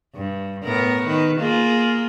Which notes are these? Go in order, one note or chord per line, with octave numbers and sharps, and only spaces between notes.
G2
A2 B3 A#4
D#3 B4
A#3 F4 G#4